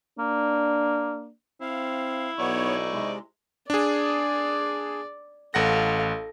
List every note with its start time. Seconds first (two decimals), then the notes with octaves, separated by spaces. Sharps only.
0.19 A#3 D4
1.61 C4 E4 F5
2.39 B1 B3 D#4 C#5 D5 C#6
2.93 C3 G#3
3.70 D4 G#4 D5
5.54 A1 A4 F5 F#5 A#6